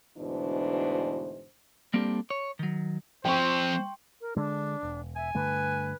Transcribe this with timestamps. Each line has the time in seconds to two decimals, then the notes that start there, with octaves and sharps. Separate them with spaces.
0.17 D2 G#2 B2 E3 D4 C5
1.94 G3 A#3 C4 D4 G4 A4
2.30 C#5
2.59 D#3 F#3
3.25 F3 C4 C5 G5 C6 C#6
4.21 A#4
4.37 D3 G#3 D4
4.83 E1
5.16 E5 G#5
5.35 G2 D3 A3 B4